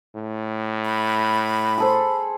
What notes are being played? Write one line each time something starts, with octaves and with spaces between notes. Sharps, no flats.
A2
B5
G#4 A4 C5